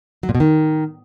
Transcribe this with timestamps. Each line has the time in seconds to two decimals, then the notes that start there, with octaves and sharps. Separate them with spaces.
0.23 F#3
0.29 A#2
0.35 B2
0.40 D#3